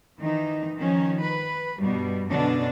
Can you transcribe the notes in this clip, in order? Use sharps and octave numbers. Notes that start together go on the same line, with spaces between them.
D#3 E3 D#4
D#3 F3 C#4
B4
G2 B2 G3
F#2 B2 D3 F#3 D4